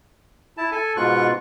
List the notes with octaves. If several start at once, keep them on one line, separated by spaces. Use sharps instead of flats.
E4 A5
A4 G#5
G#2 B2 F4 C#6 F#6